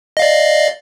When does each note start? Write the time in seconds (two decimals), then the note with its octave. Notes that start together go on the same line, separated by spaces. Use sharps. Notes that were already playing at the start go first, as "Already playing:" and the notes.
0.17 D#5
0.19 F5
0.22 D5